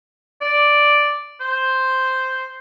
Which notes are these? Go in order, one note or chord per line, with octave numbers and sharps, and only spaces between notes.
D5
C5